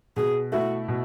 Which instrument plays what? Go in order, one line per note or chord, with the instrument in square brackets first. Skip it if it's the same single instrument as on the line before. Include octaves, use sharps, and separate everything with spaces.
[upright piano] B2 [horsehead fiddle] G#4
[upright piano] A3 E4 [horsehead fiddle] F#4
[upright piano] B2